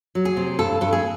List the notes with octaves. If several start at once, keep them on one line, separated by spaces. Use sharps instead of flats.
F#3
G#4
C3
G2 A4
G2 A4
G#4